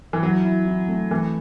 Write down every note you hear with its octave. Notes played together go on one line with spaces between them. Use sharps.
E3
F#3 E4
E4
E4
A3
E3 A3